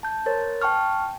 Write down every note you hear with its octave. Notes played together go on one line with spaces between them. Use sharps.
A5 G6
A#4 C5 C#5 A6
G5 A5 C#6 F6